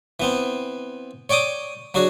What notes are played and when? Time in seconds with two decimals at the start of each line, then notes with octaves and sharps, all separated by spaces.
0.20 E3 B3 C4
1.29 C#5 D5 G5 D6 D#6
1.94 F#3 D4 F#4 G#4